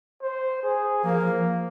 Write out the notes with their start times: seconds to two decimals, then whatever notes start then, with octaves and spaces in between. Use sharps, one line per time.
0.22 C5
0.63 G#4
1.04 F3 A#3